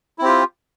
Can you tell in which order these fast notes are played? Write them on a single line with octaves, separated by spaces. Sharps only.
E4 C4 G4 F4